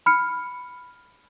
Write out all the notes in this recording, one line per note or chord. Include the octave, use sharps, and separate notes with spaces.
B5 F6 C#7